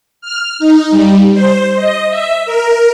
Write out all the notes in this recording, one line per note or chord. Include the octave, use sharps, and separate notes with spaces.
F6
D#4
G3
C5
D#5
E5
A#4